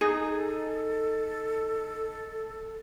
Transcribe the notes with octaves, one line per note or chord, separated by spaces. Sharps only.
D#4 G#4 A4